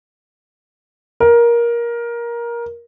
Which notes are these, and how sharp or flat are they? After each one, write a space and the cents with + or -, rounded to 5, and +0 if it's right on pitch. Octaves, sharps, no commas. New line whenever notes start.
A#4 +15